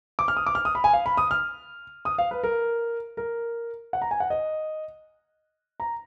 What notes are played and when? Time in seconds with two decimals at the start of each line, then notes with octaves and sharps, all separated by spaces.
0.19 D6
0.28 F6
0.37 D#6
0.47 D6
0.55 F6
0.65 D#6
0.75 B5
0.84 G#5
0.93 F5
1.06 B5
1.17 D#6
1.31 F6
2.05 D#6
2.18 F5
2.31 B4
2.43 A#4
3.17 A#4
3.93 F#5
4.02 A#5
4.11 G#5
4.20 F#5
4.30 D#5
5.80 A#5